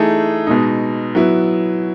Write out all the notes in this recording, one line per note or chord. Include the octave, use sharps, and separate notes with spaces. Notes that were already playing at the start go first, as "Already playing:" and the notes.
Already playing: E3 A3 D#4 G#4
B2 G#3 D#4
F#3 B3 E4